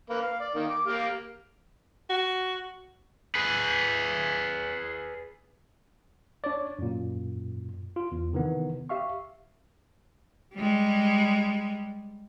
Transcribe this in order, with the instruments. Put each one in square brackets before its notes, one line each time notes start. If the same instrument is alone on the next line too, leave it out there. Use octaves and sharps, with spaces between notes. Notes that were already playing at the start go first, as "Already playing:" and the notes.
[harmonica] A#3 B4
F5
D5
D#3 A#3
D6
A#3 G4 F5
[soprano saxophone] F#4
[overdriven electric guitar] G#4 B4
[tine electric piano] D4 C#5 D5
F#2 A#2
F4
E2
C3 D#3 E3 B3
G4 E5 F5 C#6
[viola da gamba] G3 G#3